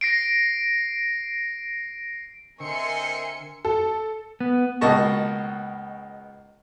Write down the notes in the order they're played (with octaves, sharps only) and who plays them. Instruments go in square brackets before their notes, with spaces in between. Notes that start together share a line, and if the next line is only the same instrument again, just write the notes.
[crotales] A#6 C7 D7
[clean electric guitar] D3 [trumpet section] C4 D#5 C6 [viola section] A#4 E5 [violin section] G#5 C#7
[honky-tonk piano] A4
[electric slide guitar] B3
[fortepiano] C#2 B2 A#3 D#5 A5 C#6